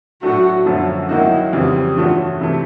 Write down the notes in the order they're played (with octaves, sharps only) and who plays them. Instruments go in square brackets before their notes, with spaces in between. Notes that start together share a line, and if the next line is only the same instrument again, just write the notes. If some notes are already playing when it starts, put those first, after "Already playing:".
[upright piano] A2 F#3 A3 D4 [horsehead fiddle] F#4
[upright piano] F#2 D3 F3 A3 C#4
[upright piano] D#3 F#3 A#3 D#4 F#4 [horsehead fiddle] E4
[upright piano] F2 C#3 E3 G3 C4
[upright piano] G2 E3 A3 C#4 F#4 [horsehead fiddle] F4
[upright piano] C3 E3 A3